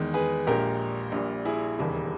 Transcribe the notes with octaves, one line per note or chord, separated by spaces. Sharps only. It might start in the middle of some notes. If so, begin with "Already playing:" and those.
Already playing: E2 D#3 G#3
G#4 B4
A#1 A#2 G#3 G4 A#4
A#1 A#2 G3
E4 G#4
E1 D#2 C#3 E3 G3